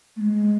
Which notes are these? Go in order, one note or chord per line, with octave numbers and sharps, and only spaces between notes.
A3
G#3